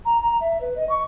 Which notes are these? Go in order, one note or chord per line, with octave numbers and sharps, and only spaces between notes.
A#5
A#5
E5
B4
D#5
C#6